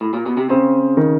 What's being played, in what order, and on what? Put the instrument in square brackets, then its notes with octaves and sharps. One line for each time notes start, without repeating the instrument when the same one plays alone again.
[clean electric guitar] A2
A#2
B2
C3
[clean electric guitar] C#3 [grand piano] C4
[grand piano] D#3